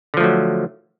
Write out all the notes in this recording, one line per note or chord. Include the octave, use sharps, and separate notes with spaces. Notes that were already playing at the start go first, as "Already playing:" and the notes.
D3 F3 F#3 A3